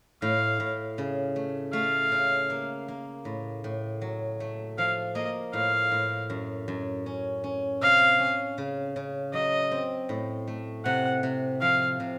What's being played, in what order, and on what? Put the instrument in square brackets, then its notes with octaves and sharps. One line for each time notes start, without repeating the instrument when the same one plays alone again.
[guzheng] A2 [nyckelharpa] F5
[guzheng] A2
C#3
A3
[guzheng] A3 [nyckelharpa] F5
[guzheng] C#3
A#3
A#3
A2
A2
F#3
A3
[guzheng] F3 [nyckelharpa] F5
[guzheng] A#3 [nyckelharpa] D#5
[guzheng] A2 [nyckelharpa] F5
[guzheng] A2
F#2
F#2
C#4
C#4
[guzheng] C3 [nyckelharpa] F5
[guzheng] C#4
C#3
C#3
[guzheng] F#3 [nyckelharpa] D#5
[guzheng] C4
A2
A3
[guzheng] C3 [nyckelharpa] F#5
[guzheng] C3
[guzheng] F3 [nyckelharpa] F5
[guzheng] C3